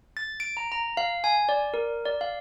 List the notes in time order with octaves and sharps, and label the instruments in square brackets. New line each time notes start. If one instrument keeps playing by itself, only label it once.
[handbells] A6
D7
A#5
A#5
F5
G#5
D5
A#4
D5
F5